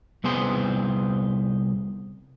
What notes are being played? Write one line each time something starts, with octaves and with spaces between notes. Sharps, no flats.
C2 B3 G#4 C5